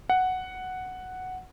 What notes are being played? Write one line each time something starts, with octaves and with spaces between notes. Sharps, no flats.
F#5